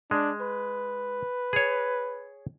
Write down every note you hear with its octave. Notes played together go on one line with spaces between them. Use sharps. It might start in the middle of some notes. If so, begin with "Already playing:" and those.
G#3 D4
B4
G#4 C#5